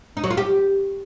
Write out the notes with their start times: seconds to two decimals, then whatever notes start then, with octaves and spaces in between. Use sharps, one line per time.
0.17 D#4
0.24 F#3
0.31 F4
0.37 G4